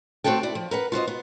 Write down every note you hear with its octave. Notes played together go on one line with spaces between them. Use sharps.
A3 C4 F#4 G4 A4 G5
E4 D5
F3
A#4 B4 F#5
F4 F#4 C5 D#5
B3